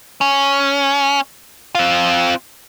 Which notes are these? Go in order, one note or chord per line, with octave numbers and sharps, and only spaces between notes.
C#4
C4 F4